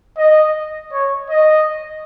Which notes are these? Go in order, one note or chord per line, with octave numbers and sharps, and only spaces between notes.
D#5
C#5
D#5